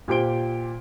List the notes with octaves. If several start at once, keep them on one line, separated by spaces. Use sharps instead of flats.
A#2 G4 C5 D7 G7